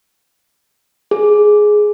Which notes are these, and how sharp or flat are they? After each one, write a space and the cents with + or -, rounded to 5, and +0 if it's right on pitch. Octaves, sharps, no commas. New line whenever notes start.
G#4 +10